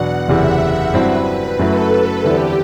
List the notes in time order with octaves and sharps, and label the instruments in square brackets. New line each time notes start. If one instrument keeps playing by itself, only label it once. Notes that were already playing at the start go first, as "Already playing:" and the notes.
Already playing: [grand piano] E2 B2 F#3 B3 D4 [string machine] F#5
[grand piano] F#1 E2 C3 E3 [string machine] E5
[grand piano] G2 F#3 C4 E4 [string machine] B4
[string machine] B4
[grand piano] F#2 F#3 A3 E4 [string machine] A4
[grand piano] E2 D3 G3 C4 E4 [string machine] G4